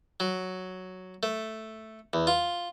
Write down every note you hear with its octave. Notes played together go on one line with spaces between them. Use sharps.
F#3
A3
E2
F4